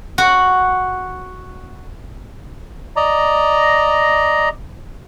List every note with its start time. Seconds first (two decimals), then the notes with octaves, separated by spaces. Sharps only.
0.18 F#4 F#5
2.96 D5 D#5 A#5